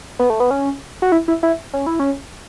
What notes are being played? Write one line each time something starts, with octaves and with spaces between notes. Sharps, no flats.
B3
A3
B3
C#4
F#4
E4
E4
E4
C#4
E4
C#4